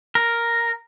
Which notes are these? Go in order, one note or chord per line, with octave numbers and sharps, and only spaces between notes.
A#4